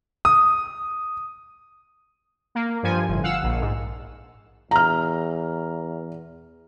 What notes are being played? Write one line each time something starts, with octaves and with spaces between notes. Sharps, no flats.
D#6
A#3
G2 F3 G#5
G1 A2
F5 F#5 E6
A#1
G#2
E2 A#5 F6